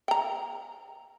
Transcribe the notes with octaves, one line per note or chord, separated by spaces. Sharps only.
G5 A#5